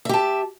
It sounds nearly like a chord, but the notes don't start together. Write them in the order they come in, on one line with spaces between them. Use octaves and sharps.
E5 G4 A5